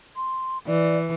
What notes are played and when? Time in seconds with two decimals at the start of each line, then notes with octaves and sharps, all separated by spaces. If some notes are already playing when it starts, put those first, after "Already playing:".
0.16 C6
0.67 E3 D5